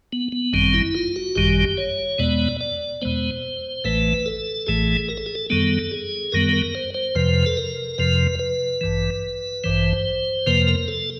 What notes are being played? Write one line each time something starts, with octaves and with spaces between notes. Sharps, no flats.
B3
B3
G#1 F#2 D#3 G3 C4
E4
F4
F#4
G#1 F#2 D#3 G3 G4
C#5
E2 B2 G#3 B3 D5
D5
E2 B2 G#3 B3 C5
A1 A2 E3 A3 B4
A4
A1 A2 E3 A3 G#4
A#4
A4
G#4
A4
F#2 D#3 G3 B3 A4
G#4
F#2 D#3 G3 B3 A#4
A#4
C5
C5
F2 C3 F3 B4
A4
A#4
F2 C3 F3 B4
B4
A1 G2 E3
A1 G2 E3 C5
F2 C3 F3 A#3 B4
A#4
A4